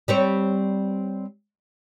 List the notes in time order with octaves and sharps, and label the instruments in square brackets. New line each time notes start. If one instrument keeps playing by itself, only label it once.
[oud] G3 C4 C#5